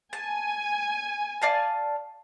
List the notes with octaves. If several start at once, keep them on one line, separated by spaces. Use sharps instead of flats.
G#5 A5
D5 F5 A5